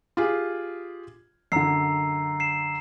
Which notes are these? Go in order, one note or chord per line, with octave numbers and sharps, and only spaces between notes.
F4 G4 G#4
F#2 D3 A#5 E6 C7
C7 E7